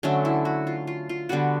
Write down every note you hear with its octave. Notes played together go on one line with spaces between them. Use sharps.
D3 F#3 A3 C#4
E4
F#4
F4
F4
F4
D3 G3 B3 F#4